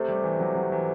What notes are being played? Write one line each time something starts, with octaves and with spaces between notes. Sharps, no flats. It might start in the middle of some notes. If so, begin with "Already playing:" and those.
Already playing: C3 A3
G3
E3
F#3
F#3
E3